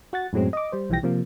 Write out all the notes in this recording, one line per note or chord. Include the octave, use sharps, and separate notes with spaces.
F#4 F#5 A6
F#2 A2 F#3 G#3 C4
D#5 D6
G3 C5
B1 E3 F3 G3 G5 A#6
C3 F3 A#3